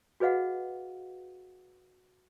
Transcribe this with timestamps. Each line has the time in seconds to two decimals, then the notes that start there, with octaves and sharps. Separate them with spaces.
0.20 F#4 G#4 B4 D#5 F5 F#5